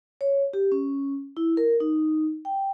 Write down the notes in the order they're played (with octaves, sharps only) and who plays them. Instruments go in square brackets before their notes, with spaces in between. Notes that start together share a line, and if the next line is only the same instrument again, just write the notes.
[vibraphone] C#5
G4
C#4
E4
A#4
D#4
G5